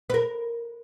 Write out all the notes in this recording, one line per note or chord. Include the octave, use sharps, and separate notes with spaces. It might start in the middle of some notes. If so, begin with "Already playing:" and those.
B4
A#4